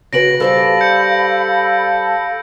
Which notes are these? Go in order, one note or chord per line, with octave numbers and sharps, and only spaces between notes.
C#3 F#4 B4 A#6 D7 F#7
G3 A4 C5 D5 F5 B5
G6 C#7